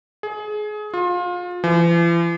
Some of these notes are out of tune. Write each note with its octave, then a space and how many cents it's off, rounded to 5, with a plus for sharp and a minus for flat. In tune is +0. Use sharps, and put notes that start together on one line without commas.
G#4 +25
F4 +30
E3 +45